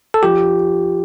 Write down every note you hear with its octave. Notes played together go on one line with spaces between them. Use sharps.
A4
F3 G4